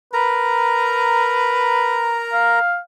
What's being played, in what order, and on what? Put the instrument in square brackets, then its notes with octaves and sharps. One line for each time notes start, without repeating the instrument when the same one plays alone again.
[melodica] A#4 A#5 [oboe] B4
[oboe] F5